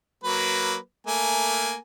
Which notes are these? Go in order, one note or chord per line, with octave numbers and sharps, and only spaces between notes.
F#3 A#3 B4
A3 A#3 G#5